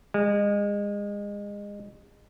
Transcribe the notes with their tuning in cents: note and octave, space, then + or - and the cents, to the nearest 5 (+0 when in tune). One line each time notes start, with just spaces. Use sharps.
G#3 -25